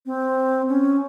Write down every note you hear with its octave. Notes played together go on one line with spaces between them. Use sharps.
C4
C#4